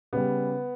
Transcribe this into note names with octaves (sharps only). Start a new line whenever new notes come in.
C#3 G3 B3